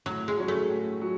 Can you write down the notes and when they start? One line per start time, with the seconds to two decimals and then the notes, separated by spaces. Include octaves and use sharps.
0.06 A2 F#3
0.28 G#3
0.37 F#3 C#4
0.48 A3
0.70 A2
1.01 F#3